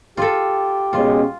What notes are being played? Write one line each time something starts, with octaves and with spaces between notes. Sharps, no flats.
F4 G4 A4
B2 G#3 C#4 F4